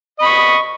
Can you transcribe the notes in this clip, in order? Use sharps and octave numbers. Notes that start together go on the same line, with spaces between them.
D#5 B5 C#6